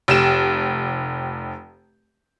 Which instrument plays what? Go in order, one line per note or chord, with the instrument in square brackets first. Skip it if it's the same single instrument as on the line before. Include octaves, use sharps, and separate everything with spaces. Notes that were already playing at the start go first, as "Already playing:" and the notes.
[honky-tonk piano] F1 G4 E7